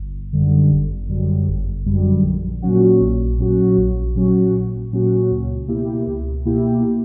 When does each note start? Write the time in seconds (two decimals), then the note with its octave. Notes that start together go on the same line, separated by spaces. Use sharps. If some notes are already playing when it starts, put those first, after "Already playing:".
Already playing: G1
0.33 F#2 D3 G3
0.71 G1
1.08 F#2 D3 G3
1.48 G1
1.85 F#2 D3 G3
2.23 A#1
2.62 A#2 F#3 C#4 F#4
3.01 A#1
3.38 A#2 F#3 C#4 F#4
3.77 A#1
4.15 A#2 F#3 C#4 F#4
4.53 A#1
4.92 A#2 F#3 C#4 F#4
5.31 C#2
5.68 B2 A#3 E4 G4
6.06 C#2
6.45 B2 A#3 E4 G4